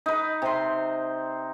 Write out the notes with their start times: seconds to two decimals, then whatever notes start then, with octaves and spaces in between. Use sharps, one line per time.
0.06 D#4 B4
0.42 C3 C6